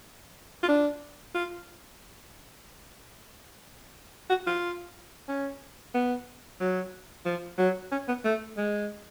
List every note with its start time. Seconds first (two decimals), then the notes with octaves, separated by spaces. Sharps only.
0.63 F4
0.68 D4
1.34 F4
4.30 F#4
4.47 F4
5.28 C#4
5.94 B3
6.60 F#3
7.25 F3
7.59 F#3
7.92 C#4
8.08 B3
8.24 A3
8.57 G#3